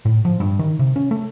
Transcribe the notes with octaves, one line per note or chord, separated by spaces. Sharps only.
A2
F3
G2
D#3
C3
C#4
A3